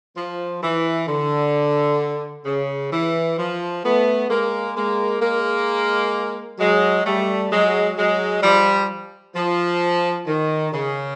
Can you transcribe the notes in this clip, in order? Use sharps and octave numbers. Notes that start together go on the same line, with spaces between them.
F3
E3
D3
C#3
E3
F3
A3 B3
G#3 A#3
G#3 A#3
G#3 A#3
F#3 G#3
G3 A3
F#3 G#3
F#3 G#3
F3 G3
F3
D#3
C#3